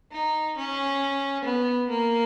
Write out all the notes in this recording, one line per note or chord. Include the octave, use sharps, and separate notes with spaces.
D#4
C#4
B3
A#3